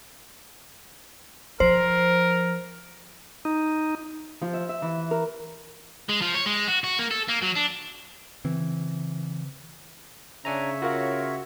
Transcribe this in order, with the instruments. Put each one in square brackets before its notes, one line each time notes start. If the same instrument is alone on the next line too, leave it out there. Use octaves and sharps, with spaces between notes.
[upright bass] F3 [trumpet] A#4 [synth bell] C5
[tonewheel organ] D#4
[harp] F3
E5
E5
E3
A#4
[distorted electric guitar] G#3
F3
C#5
G#3
F#4
F#4
A#3
A4
A#3
F#3
D4
[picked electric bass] C#3 C4 [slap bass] E3
[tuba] C#3 [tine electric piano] D4 G#5 A#5 [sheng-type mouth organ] C#5 E5
[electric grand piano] F4 A#4 F5 [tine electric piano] F#4